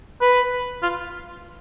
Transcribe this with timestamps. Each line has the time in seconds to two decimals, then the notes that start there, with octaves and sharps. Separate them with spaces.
0.21 B4
0.83 F4